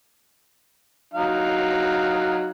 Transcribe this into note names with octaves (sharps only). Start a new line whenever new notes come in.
F#3 D#4 F5